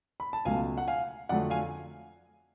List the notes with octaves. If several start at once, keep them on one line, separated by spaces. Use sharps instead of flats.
B5
A5
C#2 B2 F#3 A3 F5 G#5
F#5
F5 G#5
F2 D3 F#3 A3 D5 F#5
F5 G#5